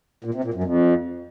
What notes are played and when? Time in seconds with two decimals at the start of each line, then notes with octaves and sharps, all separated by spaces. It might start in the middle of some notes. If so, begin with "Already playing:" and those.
0.24 A#2
0.34 C3
0.44 A#2
0.54 F#2
0.64 F2